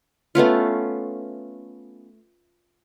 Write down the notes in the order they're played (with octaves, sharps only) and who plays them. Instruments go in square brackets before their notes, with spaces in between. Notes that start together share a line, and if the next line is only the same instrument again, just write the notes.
[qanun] A3 B3 C#4 F4